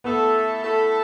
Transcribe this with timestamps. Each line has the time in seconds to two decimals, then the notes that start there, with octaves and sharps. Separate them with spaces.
0.04 A3 B3 E4 A4
0.64 A3 E4 A4